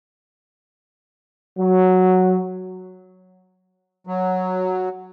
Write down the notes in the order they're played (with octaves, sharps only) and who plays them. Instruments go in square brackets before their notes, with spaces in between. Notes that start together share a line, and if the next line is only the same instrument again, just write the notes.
[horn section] F#3
[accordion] F#3